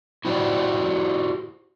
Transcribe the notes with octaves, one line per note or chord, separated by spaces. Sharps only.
E4 F#4 G4 C5 D5